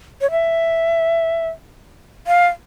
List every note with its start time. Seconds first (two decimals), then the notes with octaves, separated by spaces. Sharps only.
0.21 C#5
0.31 E5
2.27 F5